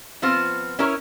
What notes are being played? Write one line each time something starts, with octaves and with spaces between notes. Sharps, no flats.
F3 B3 C4 F4 C5
C#4 E4 A#4 C#5